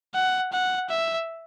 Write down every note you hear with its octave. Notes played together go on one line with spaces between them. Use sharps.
F#5
F#5
E5